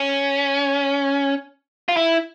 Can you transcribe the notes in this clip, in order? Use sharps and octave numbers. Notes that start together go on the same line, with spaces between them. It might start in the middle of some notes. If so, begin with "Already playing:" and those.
Already playing: C#4
F4
E4